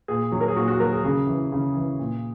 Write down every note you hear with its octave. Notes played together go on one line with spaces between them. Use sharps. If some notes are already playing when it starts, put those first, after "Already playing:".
A#2 G#4
F#3
A#4
G#4
A#2 F#4
F#4
F#3 A#4
G#4
C#3 G#4
E3
C#3
E3
A#2